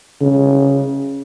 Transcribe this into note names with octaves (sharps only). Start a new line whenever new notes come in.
C#3